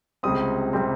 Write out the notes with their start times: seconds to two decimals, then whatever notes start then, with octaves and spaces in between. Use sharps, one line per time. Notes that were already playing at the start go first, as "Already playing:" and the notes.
0.23 C#2 C3 G3 C4 D#6
0.73 C3 G3 C4